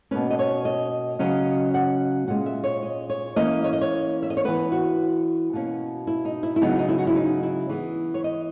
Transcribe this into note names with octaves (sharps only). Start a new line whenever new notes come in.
B2 A#3 C#4 B4
D#5
C#5
D#5
C#3 F#3 C#4 D#5
F#5
A#2 G#3 C#4 F#5
E5
C#5
D#5
C#5
E3 A#3 C#4 D#5
C#5
D#5
C#5
E5
D#5
C#5
E3 B3 B4
F#4
B2 A#3 C#4
E4
D#4
E4
E4
C#3 F#3 B3 D#4
D#4
E4
F#4
E4
D#4
E4
E3 B3 G#4
C#5
D#5